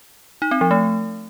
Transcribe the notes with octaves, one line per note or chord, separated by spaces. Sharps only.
D#4
C4
F3
A3